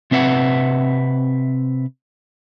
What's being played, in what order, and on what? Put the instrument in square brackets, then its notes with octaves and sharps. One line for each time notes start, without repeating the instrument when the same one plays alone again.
[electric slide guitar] C3 C4 B4 E5 F#5